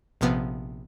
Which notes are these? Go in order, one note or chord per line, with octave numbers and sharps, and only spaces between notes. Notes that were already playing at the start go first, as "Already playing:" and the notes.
A#1 C3 F3 B3